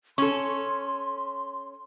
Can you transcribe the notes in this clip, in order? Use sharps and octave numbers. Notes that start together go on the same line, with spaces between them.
C#4 A4 C6 C#6